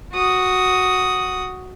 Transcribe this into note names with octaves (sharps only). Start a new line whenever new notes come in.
F#4 D#6